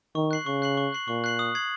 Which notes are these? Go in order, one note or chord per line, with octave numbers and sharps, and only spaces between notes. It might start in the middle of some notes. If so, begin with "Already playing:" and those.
D#3 C#6
F#6 C7 F#7
C#3 C#6
F#6 C7 F#7
C#6
F#6 C7 F#7
A#2 C#6
F#6 C7 F#7
D#6
G#6 C7 F#7